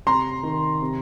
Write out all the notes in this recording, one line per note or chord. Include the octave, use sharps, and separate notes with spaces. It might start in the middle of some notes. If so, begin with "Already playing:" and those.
C3 A#5 C6
D#3
C3